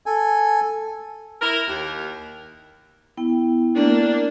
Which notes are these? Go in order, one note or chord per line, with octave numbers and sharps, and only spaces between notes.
A4 G#5
E4 A#4
D#2
B3 E4 G5
A#3 D4